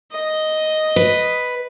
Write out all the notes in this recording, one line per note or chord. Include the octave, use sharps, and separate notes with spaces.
D#5
B4